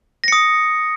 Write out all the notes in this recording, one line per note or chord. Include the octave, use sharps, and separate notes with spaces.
D#6 A#6 C#7